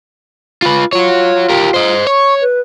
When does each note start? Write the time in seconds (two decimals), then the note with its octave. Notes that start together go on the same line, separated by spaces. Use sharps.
0.62 F4 B4
0.93 F4 F#4 C#5
1.50 G4 A#4
1.74 C5 D#5
2.07 C#5 C#6
2.41 B4